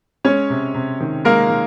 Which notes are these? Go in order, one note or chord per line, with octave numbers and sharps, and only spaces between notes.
G#3 C#4 C#5
C3
C3
D#3
G#3 A#3 A#4
D#3